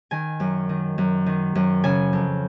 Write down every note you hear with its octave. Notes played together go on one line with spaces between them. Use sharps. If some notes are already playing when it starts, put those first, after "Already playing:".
D#3 G#5
F#2
D#3
F#2
D#3
F#2
C#3 G#5
F2